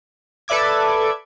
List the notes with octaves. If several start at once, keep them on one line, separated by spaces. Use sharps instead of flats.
A4 B4 D5 E5 D6 G#6